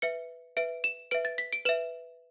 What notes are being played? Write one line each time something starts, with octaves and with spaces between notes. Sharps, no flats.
B4 E5 C#7
B4 E5 D7
E7
B4 E5 D7
A6
B6
D7
B4 E5 E7